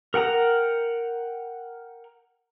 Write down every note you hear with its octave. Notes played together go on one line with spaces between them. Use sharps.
A#4 F#5 G5 A#5